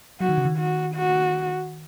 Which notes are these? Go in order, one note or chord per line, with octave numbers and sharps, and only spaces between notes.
F#3 F#4
D#3
C#3
D#3
F#4
F#4